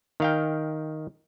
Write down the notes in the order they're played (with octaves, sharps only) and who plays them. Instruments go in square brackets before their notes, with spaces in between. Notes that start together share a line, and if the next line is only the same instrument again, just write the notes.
[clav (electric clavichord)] D#3 F5 G5